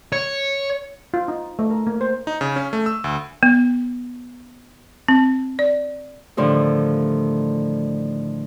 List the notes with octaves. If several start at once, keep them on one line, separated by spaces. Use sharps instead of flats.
C#5
F4
D#4
A3
A#4
A#3
C5
D#4
C#3
C#4
A3
E6
D2
B3
C4
D5
A2 D3 D#3 F3 G3 A3